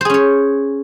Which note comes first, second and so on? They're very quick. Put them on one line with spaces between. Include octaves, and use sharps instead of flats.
C5 G#4 C#4 C#5